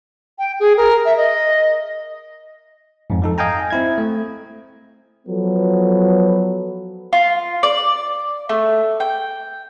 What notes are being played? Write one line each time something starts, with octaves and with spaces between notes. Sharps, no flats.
G5
G#4
A#4
E5
D#5
F2 G#2
F3 D#4 A4
D#5 F5 G5 G#5 A#5
C4 E4 G#6
A3
F3 F#3 B3 A4 B4
F4
D5
A3
G5